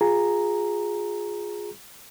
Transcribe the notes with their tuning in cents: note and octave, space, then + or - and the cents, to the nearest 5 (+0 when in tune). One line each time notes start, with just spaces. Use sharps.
F4 +25 G#4 +0 A#5 +0